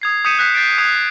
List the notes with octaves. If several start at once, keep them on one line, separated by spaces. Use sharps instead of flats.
D#6 G#6 C7
D#6 G6 B6 C#7 D#7 E7
D#6 F#6 G6 B6 C7 D#7
G6 A6 C7 D7
D#6 G#6 C7 C#7 E7